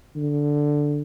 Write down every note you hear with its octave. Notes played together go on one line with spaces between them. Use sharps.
D3